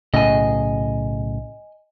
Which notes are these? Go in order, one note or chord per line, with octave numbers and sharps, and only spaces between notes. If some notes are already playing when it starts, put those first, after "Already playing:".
B1 A2 C#3 D#5 G#5